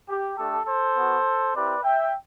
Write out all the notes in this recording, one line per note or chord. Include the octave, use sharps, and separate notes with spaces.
G4
A3 D4 G4 A4
A4 C5
B3 F#4
C4 E4 G4 B4 D5
E5 G5